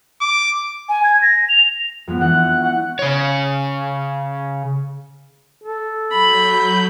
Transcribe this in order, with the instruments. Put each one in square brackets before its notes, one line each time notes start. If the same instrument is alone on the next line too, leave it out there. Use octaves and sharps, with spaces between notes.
[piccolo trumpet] D6
[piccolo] G#5
G#6
A#6
F7
[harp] F2 G#3 B3
[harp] E3 D4 [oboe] F#5
[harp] F#6
[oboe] F#5
[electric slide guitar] C#3 C#5
[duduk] A4
[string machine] F#3 G6 [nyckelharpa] B5